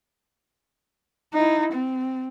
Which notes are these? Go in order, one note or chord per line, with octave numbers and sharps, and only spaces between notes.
D#4 E4
C4